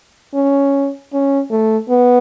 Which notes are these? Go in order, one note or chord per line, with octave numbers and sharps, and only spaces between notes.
C#4
C#4
A3
B3